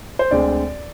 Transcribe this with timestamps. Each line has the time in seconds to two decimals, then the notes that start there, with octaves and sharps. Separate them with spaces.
0.19 C5
0.31 D2 D3 G#3 C4 D5